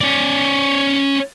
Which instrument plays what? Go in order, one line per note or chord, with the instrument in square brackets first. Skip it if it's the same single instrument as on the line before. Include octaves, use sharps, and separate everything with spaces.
[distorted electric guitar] C#4 D5